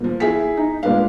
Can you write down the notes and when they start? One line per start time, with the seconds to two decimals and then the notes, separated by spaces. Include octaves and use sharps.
0.01 A#2 F3
0.20 E4 G#4 B6
0.57 D#4
0.83 A#2 G#3 D4 B4 F5